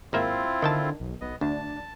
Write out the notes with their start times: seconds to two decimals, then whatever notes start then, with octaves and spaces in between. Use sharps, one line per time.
0.13 G#1 A#3 C4 E4 F4 E5
0.62 D3 D#3 G5 A5
1.00 B1
1.21 B1 B3 D#5
1.41 D2 D4 A5